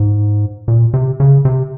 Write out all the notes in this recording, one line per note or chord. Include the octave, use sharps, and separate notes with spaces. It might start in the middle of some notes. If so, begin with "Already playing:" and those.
Already playing: G#2
A#2
C3
C#3
C3